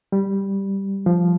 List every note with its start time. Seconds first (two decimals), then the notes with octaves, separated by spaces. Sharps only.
0.12 G3
1.06 F3